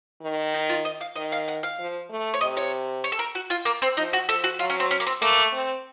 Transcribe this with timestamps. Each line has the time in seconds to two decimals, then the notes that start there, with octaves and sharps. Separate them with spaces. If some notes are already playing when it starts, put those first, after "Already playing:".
0.22 D#3
0.54 D#4
0.69 F4
0.85 D#5
1.01 F5
1.16 D#3 D#5
1.32 F5
1.48 F#5
1.63 F5
1.79 F3
2.10 A3
2.34 C#5
2.41 C3 D#5
2.57 C#5
3.04 C#5
3.12 A4
3.19 A#4
3.35 F#4
3.50 F4
3.65 A#3
3.82 C4
3.97 F3 D#4
4.13 F#4
4.28 F3 A4
4.44 F#4
4.59 F#3 F4
4.70 C#4
4.80 C4
4.91 C#4
5.00 A#3
5.07 C4
5.22 A3 A#3
5.53 C4